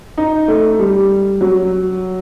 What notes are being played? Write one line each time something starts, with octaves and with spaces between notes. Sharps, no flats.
D#4
A3
G3
F#3